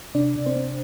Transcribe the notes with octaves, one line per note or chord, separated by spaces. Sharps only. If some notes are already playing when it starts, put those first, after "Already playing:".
C3 D4 D5
C3
C4 C5
C4